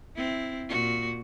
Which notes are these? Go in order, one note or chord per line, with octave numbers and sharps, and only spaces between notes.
C4 E4
A#2 F#4